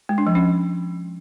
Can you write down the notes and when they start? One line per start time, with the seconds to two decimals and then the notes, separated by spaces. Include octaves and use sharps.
0.09 G#3
0.18 D4
0.27 F3
0.35 C#4